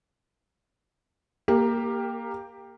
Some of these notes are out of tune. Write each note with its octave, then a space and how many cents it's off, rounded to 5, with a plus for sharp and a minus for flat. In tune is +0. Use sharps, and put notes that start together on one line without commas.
A#3 +0 G4 +10 A#4 -30